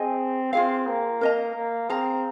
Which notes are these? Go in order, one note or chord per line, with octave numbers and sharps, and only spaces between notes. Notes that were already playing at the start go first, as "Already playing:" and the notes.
Already playing: C4 G#4 D#5 G#5
C4 F4 G#4 F5
A#3
A#4 D#5 A#5
A#3
C4 G#4 F5 A#5